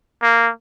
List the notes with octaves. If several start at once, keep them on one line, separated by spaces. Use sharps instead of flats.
A#3